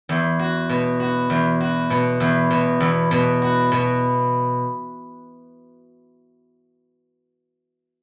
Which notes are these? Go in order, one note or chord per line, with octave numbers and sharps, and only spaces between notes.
E2
F#4
B2
F#4
E2
F#4
B2
E2
B2
E2
B2
F#4
B2